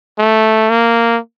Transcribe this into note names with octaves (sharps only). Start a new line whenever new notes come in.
A3
A#3